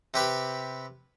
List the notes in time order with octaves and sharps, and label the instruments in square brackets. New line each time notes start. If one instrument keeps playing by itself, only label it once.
[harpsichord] C3 G4 B4 B5